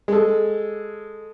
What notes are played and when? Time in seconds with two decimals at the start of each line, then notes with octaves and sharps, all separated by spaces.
0.08 G#3 A4